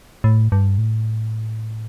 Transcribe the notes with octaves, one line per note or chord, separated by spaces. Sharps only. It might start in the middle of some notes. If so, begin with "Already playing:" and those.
A2
G2
A2